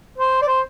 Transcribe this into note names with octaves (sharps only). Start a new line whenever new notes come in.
C5
D5
C5